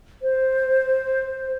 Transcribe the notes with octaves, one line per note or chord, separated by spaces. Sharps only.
C5